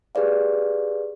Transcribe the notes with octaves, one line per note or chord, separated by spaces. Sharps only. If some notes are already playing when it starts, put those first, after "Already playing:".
G4 G#4 B4 D5 F5